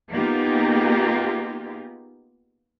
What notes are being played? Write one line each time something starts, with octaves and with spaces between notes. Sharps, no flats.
A#3 B3 D#4 F4 G4 G#4